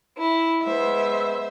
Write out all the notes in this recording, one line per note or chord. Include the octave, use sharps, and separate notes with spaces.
E4
G#3 B3 C5 E5